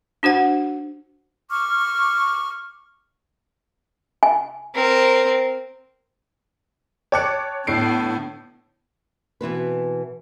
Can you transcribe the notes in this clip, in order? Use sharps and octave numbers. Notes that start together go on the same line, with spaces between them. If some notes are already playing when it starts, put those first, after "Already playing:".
D4 F#4 C5 F#5
C#6 D6 F6
G#5
C4 A#4
C#5 G5 A5 D6 F#6 C#7
A2 D3 B3 C7 D7
B2 E3 C4 B4